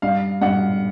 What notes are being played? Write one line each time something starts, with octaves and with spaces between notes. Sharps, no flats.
G2 F5
G2 F#5